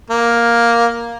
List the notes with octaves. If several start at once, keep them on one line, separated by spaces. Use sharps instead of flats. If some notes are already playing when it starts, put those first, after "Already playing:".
A#3